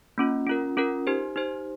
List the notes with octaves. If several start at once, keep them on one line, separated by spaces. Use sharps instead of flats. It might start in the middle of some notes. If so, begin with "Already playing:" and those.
A#3 C#4 F4
C#4 F4 A#4
C#4 F4 A#4
D#4 G4 C5
D#4 G4 C5